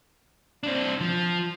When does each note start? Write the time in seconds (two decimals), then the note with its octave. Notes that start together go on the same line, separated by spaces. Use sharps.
0.63 C4 D4
1.01 F3